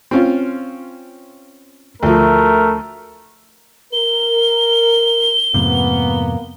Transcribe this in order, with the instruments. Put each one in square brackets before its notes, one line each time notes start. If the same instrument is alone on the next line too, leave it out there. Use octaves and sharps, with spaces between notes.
[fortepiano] C4 C#4 F4
[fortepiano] D2 F3 [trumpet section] A3 A#4
[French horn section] A#4 [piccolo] G7
[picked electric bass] F2 G#2 C3 [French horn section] A#3 B3